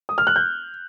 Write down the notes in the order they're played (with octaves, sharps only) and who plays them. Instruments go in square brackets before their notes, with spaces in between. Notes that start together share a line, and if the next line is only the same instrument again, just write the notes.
[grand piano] D#6
F6
F#6
G6